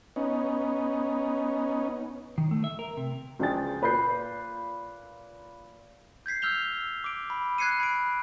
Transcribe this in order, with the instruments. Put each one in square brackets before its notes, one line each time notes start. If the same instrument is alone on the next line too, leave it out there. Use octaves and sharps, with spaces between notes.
[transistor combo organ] B3 C#4 D#4
[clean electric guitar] D#3
A3
E5
A#4
C3
[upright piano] C#2 F3 D4 G#4 G5 A6
A#2 B4 B5 G6 C7
[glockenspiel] G6 G#6 B6 C7
E6 F6 G6 F7 G7
D6 D7
B5
F#6 G#6 C7 C#7 D#7
B5 D7